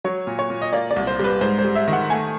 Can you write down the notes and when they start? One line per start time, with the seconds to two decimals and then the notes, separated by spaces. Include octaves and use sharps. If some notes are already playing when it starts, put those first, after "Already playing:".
0.04 F#3 C#5
0.27 A#2
0.39 C#5
0.50 A#2
0.62 D#5
0.73 A#3 D5
0.91 D5
0.96 C2
1.07 C5
1.19 G3 B4
1.41 G#2 C5
1.59 C5
1.64 G3
1.75 E5
1.88 D#3
1.93 F#5
2.10 A3 G#5